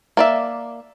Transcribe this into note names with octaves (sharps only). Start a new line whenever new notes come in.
A#3 D5 E5